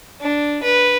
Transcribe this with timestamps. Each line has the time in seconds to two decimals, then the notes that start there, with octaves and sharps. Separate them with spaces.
0.21 D4
0.63 B4